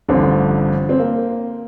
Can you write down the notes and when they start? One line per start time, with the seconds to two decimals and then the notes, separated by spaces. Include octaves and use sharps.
0.08 A1 G2 D3 F3 C4
0.89 C4
0.99 A#3